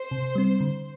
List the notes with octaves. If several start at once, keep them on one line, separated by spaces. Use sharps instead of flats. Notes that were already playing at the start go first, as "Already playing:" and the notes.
Already playing: C5
C3
G3 C4
D3